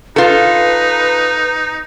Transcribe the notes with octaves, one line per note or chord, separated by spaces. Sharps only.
D#4 F4 A4 B4